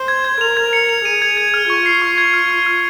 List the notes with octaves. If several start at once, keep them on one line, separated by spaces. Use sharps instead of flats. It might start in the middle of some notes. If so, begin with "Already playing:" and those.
Already playing: C5
G#6
G#6
A#4 F7
G#6
C#7
F7
G#4 D#7
G#6
G#6
F6
F4 C#6
C7
C#6
G#6
F6
F6
F6